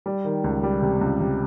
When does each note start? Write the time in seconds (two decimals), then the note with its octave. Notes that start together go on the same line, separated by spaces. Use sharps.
0.06 G3
0.25 D#3
0.44 C#2
0.63 G3
0.82 C3
1.01 C#2
1.20 C3